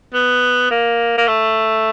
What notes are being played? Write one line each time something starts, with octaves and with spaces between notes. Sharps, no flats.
B3
A#3
A#3
A3